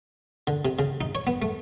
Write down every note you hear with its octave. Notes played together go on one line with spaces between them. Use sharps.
D3
C3
C#3
D#4
C#5
B3
A3